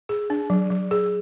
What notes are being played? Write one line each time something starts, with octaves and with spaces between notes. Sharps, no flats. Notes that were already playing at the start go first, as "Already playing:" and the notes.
G#4
D4
F#3
F#3
G#4